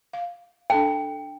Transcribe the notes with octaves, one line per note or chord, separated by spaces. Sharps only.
F5
D4 A4 G5 A5